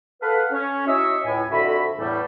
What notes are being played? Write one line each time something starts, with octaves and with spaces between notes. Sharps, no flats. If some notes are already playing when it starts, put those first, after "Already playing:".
A4 B4 F5 F#5
C#4
D#4 E4 F#4 C#5 D#5 E5
C#2 A2 G#5
F2 D3 F#4 E5 B5
E2 A2 G3 A3